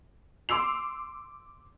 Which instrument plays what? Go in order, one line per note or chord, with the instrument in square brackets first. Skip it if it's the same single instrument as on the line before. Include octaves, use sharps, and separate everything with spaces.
[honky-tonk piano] C6 D6 E6 C7 F7